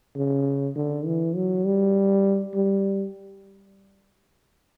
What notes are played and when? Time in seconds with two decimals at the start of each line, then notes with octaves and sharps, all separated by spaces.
0.16 C#3
0.76 D3
1.06 E3
1.35 F#3
1.65 G3
2.54 G3